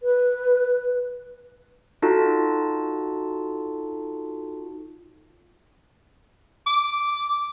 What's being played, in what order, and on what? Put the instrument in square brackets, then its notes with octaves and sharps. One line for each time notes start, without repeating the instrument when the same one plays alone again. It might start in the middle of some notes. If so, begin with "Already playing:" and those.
[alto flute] B4
[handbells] D#4 F4 F#4 A4 A5
[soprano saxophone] D6